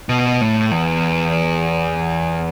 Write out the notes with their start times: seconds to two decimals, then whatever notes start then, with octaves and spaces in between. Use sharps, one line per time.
0.09 B2
0.41 A2
0.72 E2